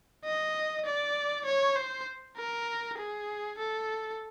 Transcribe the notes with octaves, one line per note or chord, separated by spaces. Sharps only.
D#5
D5
C#5
C5
A#4
G#4
A4